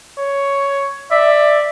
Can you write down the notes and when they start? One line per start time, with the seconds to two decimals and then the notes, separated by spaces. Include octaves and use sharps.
0.18 C#5
1.11 D5 E5